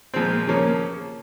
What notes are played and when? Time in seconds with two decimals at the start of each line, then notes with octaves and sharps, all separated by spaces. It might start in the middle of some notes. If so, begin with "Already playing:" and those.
0.14 A#2 F3 G#3 C4
0.47 C#3 F3 A#3 C#4